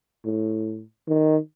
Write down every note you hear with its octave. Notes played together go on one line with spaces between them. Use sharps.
A2
D#3